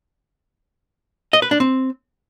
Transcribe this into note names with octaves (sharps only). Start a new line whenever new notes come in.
D#5
B4
D4
C4